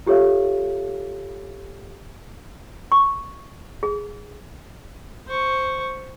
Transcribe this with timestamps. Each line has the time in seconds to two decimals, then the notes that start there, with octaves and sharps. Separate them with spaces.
0.06 F4 G4 A4 C#5 E5 F5
2.92 C#6
3.83 G#4
5.27 C5 C#6